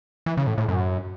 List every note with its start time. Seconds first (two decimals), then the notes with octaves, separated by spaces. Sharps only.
0.26 E3
0.37 C#3
0.47 A2
0.58 A2
0.68 F#2